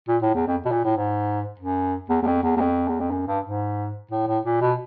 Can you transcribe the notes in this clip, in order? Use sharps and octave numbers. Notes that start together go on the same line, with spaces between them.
A#2
A2
E2
F2
B2
A#2
A2
G#2
F#2
E2
E2
F2
E2
E2
F2
E2
F2
F#2
G2
G#2
A2
A2
A#2
B2